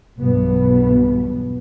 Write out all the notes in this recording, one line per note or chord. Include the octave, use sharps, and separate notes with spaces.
B1 E2 G2 B2 B3